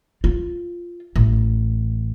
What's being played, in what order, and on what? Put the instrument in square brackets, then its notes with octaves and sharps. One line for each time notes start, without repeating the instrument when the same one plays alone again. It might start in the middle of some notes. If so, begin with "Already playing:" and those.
[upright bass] F4
A1